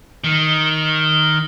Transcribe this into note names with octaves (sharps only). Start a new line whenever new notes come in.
D#3